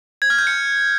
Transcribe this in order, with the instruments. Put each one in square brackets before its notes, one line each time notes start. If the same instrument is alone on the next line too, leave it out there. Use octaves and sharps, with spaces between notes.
[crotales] G#6
F6
G6
C#7